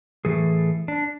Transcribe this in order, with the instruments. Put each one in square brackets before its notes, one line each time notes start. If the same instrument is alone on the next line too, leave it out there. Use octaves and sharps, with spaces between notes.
[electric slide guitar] A2 E3 A3 G#4
D4